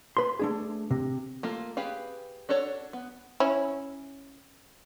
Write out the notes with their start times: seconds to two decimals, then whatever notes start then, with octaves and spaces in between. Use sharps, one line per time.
0.17 B4 C6
0.39 A3 D4 G#4
0.91 C3
1.43 A3 A#3 F4
1.77 G4 G#4 B4 F5
2.49 D4 F#4 A4 C#5
2.93 B3
3.40 C#4 E4